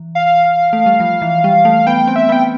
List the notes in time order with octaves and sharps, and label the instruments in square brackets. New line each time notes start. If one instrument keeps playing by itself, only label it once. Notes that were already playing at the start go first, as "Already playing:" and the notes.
Already playing: [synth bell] E3
[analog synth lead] F5
[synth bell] A3
G3
F3
E3
G3
A3
[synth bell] B3 [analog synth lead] G5
[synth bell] C4
[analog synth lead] E5
[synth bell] B3 [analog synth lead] G5